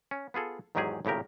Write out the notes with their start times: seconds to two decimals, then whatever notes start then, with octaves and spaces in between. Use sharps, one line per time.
0.11 C#4
0.34 B3 F4 G#4 A4
0.75 E2 G#2 D#3 F#3 G4 G#4
1.05 G#1 A2 C#3 G4 A#4